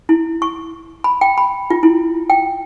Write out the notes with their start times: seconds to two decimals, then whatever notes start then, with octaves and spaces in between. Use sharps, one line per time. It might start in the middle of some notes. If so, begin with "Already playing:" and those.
0.09 E4
0.42 C#6
1.04 B5
1.21 G5
1.38 B5
1.70 F4
1.83 E4
2.30 G5